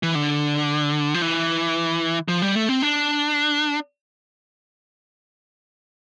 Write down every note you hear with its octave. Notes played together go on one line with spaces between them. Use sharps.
E3
D3
F3
E3
F3
G3
A3
C4
D4